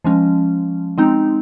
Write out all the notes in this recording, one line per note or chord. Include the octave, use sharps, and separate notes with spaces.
F3 G#3 C#4
G#3 C4 D#4